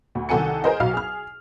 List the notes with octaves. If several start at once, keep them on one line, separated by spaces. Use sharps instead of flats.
D2
C2 D#3 A4 F#5 G#5 C#7
G#4 A#4 C5 D#5
B1 F#3 F5 F6
G#4 F6